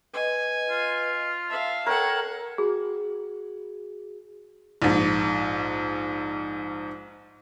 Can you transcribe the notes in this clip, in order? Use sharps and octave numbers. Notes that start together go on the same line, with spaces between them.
B4 D#5 G#5
F4
E5 F5 A5
A4 A#4 C#5 F#5 G5
F#4 G#4
A#1 G#2